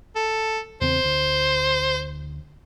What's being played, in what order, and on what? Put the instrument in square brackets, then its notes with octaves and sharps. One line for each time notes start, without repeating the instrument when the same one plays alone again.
[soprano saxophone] A4
[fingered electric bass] E2 C#3 C4 [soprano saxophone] C5
[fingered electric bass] D2